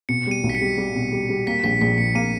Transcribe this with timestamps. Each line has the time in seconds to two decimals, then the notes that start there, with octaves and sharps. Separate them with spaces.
0.09 B2 C#7
0.27 G3 D#7
0.44 B1
0.49 B6
0.55 C#7
0.61 G3
0.77 G3
0.95 B2
1.12 G3
1.29 G3
1.47 A#3 B6
1.64 A#1 B6
1.81 A#1 B6
1.98 A#1 C#7
2.15 A#3 D#7